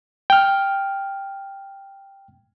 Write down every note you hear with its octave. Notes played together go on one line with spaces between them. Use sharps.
G5 F6